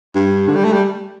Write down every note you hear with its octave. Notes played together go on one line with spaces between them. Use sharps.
G2
D3
G3
A3
G3